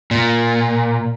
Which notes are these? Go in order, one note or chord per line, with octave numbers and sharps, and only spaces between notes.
A#2